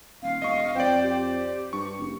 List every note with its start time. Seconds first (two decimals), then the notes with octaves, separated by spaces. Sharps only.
0.22 D#1 F5
0.42 E1 D#5 C#6
0.75 F2 C5 D5 G5
1.03 G4
1.73 G2 C#6
1.99 F#1